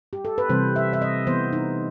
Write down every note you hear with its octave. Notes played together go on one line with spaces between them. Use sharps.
G4
A4
B4
C3 E3 G3 C4 C5
E5
E5
D#5
E3 B3 C5
D#4